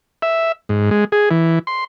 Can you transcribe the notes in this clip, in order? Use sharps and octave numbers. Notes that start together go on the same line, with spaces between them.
E5
G#2
G#3
G#4
E3
C6